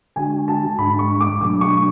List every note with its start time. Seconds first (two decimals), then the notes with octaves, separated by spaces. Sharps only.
0.16 D3 G#3 D4 F#4 G#5
0.48 A5
0.79 G#2 G#3 D4 B5
0.99 C#6
1.21 D6
1.41 B2 F#3 A3 D4 D6
1.61 C#6